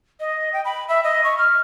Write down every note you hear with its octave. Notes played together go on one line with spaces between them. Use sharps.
D#5
G5
B5
E5
D#5
C#6
F6